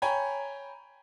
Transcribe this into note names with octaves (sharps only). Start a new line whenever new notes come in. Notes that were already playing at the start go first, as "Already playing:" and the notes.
C#5 G5 G#5 A#5 B5 G#6